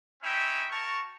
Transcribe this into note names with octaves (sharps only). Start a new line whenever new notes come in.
C4 C#4 D#4 E4 E5 G5
F#4 A#4 A5 C#6